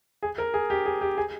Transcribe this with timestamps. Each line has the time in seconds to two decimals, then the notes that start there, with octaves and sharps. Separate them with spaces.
0.23 G#4
0.38 A#4
0.54 G#4
0.70 G4
0.85 G#4
1.01 G4
1.18 G#4